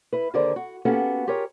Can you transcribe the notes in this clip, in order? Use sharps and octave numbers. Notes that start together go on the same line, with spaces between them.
E4 B4
D#2 D3 G#4 A#4 C5 D5
F#4
A#3 B3 C#4 F#4 G4 A4
F4 G4 G#4 A#4 C#5